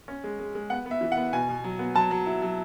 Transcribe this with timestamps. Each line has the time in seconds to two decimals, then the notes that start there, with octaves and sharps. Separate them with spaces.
0.08 C#4
0.24 G#3
0.39 G#3
0.55 G#3
0.70 B3 F#5
0.86 B3
0.91 E5
1.01 E3
1.12 F#5
1.17 B3
1.33 B2 G#5
1.49 B2
1.64 F#3
1.79 B3
1.95 F#3 A5
2.11 F#3
2.26 E4
2.42 F#3